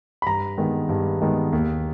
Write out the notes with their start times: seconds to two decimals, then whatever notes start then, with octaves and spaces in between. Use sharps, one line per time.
0.22 B5
0.26 G2 A#5
0.58 D#3 G#3 B3
0.89 G2
1.21 D#3 G#3 B3
1.53 D#2